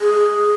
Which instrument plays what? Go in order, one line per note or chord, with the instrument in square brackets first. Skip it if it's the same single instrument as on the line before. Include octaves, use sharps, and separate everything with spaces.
[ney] G#4